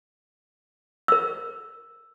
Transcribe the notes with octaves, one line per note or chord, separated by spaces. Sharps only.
A#4 E6